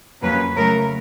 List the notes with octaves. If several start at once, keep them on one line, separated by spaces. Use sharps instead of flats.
F2 C#3 F#3 A#3 C#4 B4
C#3 F#3 A3 A#4